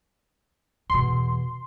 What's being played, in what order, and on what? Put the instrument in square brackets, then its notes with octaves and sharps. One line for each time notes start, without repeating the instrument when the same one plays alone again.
[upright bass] E2 B2 [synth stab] C6